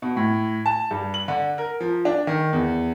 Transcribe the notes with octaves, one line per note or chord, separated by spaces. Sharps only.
B2
A2
A5
G2
F#7
D3
A#4
F3
D4
D#3
E2